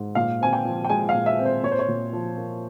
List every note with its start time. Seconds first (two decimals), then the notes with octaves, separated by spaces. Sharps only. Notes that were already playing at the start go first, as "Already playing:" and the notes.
Already playing: G#2
0.15 A#2 F5
0.41 C4 G#5
0.53 G5
0.65 F3
0.85 G5
0.89 G#3 G#5
1.09 F5
1.14 A#2
1.26 E5
1.39 C4
1.45 C5
1.63 A#2 C#5
1.72 C5
1.79 C#5
1.88 A#2
2.13 F3
2.37 A#3